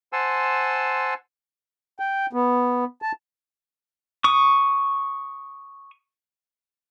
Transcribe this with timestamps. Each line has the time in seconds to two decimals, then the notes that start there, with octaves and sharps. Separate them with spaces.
0.13 C5 F#5 G#5 A5 C6 E6
2.00 G5
2.33 B3
3.02 A5
4.24 C#6 D#6